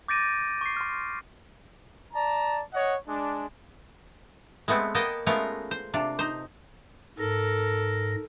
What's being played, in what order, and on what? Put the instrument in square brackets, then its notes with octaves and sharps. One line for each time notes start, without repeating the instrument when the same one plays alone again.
[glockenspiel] D6 G6 A6 A#6 D7 D#7
C#6 C7
C6 F6
[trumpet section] D5 A5 A#5
C#5 D#5 F#5
G#3 D4
[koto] G#3 A3 B3 C4
A#3 B3 D#5 G5 A5
G#3 A3 B3 C#4 F4 A#4
C5
C3 D4 F4
D#4 C5
[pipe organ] G#2 A#6 [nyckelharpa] A4 A#4